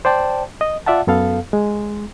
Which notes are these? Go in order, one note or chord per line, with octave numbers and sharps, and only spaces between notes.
C5 D5 G5 A5
D#5
F4 D5 E5 F#5 A5
F#2 B3 A4 F5
G#3